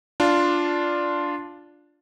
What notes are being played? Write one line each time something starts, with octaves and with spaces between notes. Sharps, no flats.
D4 F4